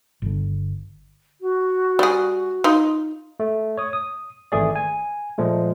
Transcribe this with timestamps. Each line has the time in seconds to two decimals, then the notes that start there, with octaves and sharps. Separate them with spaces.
0.22 G1 D3
1.41 F#4
1.99 G3 G#4
2.64 D#4 F4
3.40 A3
3.77 C#5 D#6
3.93 D#6
4.52 G#1 E3 A3 G#4 D5
4.76 G#5
5.38 A#2 F3 G#3 A3